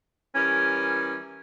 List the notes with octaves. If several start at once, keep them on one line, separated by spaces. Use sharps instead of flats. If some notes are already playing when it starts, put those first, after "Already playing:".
E3 G3 C#4 A#4